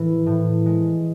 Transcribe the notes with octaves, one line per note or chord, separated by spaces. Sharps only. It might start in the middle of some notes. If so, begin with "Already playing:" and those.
Already playing: A2 E3
A2
G#3